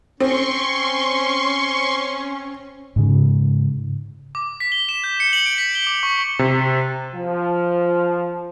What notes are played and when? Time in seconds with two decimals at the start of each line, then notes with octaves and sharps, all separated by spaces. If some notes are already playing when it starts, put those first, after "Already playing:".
0.20 C4 C#4 C6 C#6
2.96 G#2 C#3
4.35 D6
4.60 B6
4.72 G7
4.89 E7
5.04 G6
5.20 C#7
5.33 F#7
5.46 D7
5.58 B6
5.75 G7
5.87 D6
6.03 C#6
6.39 C3
7.14 F3